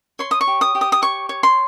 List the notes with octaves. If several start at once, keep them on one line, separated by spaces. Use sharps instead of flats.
C#5 C6
D#6
C#6
G4
D#6
G4
D#6
D#6
C#5 C#6
C#5
C6